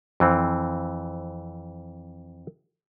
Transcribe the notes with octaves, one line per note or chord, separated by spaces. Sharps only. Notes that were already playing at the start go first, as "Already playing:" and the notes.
F2 E3 C4